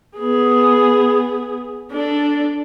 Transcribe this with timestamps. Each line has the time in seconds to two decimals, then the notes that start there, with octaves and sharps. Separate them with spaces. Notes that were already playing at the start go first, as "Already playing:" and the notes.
0.17 B3 G#4
1.92 D4 A4